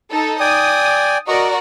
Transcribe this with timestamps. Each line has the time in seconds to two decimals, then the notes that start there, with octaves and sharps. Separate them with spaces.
0.11 D#4 A4
0.40 D5 G5 G#5 D#6
1.28 F#4 A#4 D5 D#5 A#5 C#6